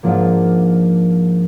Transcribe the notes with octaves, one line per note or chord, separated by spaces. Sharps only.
G#2 F3 A#3 D4 F4